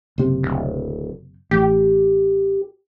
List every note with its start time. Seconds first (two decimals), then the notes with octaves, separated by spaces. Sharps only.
0.18 F#1 C3
0.43 D1
1.51 A1 G4